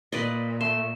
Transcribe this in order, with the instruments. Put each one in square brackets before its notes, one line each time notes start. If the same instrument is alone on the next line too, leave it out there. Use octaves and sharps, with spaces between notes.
[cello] A#2 [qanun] B4 D5 D#5
[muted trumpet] A3 [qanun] C6 [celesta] E7